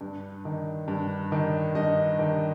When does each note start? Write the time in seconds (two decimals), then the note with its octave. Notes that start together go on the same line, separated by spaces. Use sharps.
0.01 G2
0.45 D#3
0.88 G2
1.32 D#3
1.75 G2 D#5
2.19 D#3